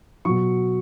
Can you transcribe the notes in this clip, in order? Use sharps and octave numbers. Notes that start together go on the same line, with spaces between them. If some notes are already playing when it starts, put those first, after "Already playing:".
B2 F#3 C#6